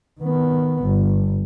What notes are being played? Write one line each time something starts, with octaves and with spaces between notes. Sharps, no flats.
D#3 B3
G1